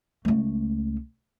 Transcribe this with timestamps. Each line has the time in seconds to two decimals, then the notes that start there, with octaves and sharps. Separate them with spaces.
0.25 C#2 A3